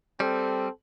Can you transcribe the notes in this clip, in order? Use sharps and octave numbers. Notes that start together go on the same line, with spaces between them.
G3 C4 A4